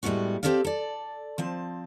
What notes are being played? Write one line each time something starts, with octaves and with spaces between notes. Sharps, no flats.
A2 G3 G#3 B3 C#4 F#4
C4 D4 G4 A4 D5 F5
A4 D5
F3 C4 A5